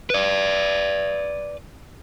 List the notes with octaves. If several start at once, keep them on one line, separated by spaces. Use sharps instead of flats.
B4 D5